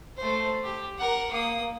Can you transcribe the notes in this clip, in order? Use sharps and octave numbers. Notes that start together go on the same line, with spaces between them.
A3 C5
G4
A#4 F#5
A#3 D#6